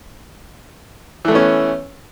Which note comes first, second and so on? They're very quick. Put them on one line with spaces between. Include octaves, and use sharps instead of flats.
E3 A3 B3 C#4